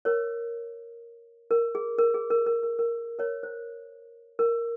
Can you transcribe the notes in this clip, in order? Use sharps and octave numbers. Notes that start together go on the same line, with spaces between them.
A#4 C#5
A#4
G#4
A#4
G#4
A#4
A#4
A#4
A#4
A#4 C#5
C5
A#4